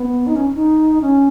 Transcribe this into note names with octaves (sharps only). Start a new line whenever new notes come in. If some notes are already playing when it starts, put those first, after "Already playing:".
Already playing: B3
D#4
C#4
D#4
C#4